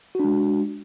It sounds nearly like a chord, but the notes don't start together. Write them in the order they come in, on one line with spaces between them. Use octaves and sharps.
F#4 D4 G#3